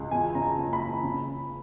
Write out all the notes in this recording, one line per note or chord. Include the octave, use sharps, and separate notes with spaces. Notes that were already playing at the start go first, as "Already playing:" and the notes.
Already playing: C#2
E2 G#5
C#3 A#5
A5
F#1
B5
E3
C#3